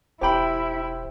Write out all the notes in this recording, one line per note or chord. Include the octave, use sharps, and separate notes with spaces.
E1 E4 G4 C5 G5 B5